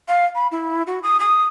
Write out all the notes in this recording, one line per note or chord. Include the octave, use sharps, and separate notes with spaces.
F5
B5
E4
F#4
D#6
D#6